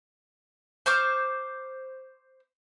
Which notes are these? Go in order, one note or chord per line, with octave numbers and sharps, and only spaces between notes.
C5 C#6 D6 F6